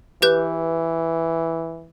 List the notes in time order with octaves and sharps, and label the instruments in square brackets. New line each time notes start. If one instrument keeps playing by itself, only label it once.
[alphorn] E3 [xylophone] G4 B4 G6